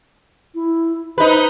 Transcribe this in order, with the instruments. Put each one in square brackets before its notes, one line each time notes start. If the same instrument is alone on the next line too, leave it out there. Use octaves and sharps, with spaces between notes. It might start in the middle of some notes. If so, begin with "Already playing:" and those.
[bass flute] E4
[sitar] D#4 B4 [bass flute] C5